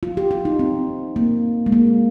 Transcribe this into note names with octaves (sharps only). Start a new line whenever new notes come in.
F4
G4
F4
D#4
C4
A#3
G#3
A#3